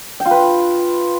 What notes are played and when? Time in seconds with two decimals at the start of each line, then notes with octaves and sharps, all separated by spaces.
0.20 G5
0.26 F4
0.31 B4